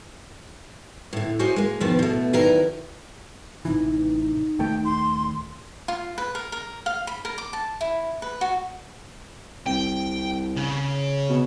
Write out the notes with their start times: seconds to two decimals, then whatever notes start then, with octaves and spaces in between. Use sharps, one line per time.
1.13 A2 D3
1.39 C#4 F#4 G4 C5 D#5
1.56 G#3 A#3
1.81 E2 B2 D#3 F3 B3
1.99 B2 A3
2.33 D2 D#3 F#3 E4 A#4 B4
3.65 A1 C3 E3 D#4
4.59 D#1 D#3 A3 G5
4.85 C6
5.88 F4
6.18 B4
6.35 A#4
6.52 A#4
6.86 F5
7.07 B5
7.25 A#4
7.38 D6
7.53 A5
7.81 E4
8.22 B4
8.41 F#4
9.66 C2 G5
10.56 C#3
11.29 B2